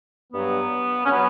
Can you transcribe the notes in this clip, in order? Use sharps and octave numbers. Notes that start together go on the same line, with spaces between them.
G2 F#3 B3
C#4
F#3 B3